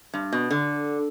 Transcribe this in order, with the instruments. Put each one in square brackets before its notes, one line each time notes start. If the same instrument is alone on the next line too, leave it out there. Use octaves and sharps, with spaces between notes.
[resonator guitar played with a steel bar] G2
B2
D3